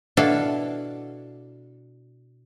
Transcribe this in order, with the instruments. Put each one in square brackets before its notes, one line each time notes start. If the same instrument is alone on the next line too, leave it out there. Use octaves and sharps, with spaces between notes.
[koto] B2 D4 E4 A4 F5